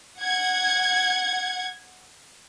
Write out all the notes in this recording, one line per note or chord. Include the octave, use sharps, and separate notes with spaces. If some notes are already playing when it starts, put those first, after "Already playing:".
F#5 G#6